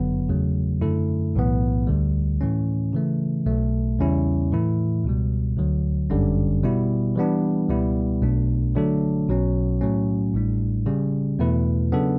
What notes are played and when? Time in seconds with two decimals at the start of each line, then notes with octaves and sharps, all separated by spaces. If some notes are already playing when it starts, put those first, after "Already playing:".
Already playing: G1 F#2 D3 F#3 B3
0.29 E2 C#3 F#3 A3
0.81 F#2 D3 A3 E4 A4
1.35 B1 A2 E3 B3
1.87 D2 D3 G3
2.41 A2 E3 A3 C#4
2.93 C#3 E3 A3
3.46 B1 B2 A3
3.99 E2 C#3 G3 C#4 E4
4.52 A2 E3 A3 E4
5.04 C#2 B2 G3
5.57 D2 D3 F#3
6.10 G1 F#2 D3 G3 C#4
6.63 B2 G3 B3 E4
7.16 E3 G3 B3 D4
7.69 C#2 B2 G3 B3 E4
8.22 B1 B2 A3 D4
8.75 D3 F#3 A3 D4 A4
9.28 B1 B2 F#3 C#4
9.81 A2 F#3 A3 C#4
10.34 A1 A2 G3 D4
10.86 C#3 G3 C#4
11.39 E2 B2 A3 E4 B4
11.92 C#3 F#3 B3 D4 A4